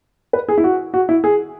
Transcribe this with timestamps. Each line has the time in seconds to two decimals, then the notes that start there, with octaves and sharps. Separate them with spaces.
0.33 B4
0.49 G#4
0.58 E4
0.64 F#4
0.94 F#4
1.09 E4
1.24 G#4